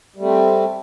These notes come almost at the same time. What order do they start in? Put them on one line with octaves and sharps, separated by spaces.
G3 A3 C4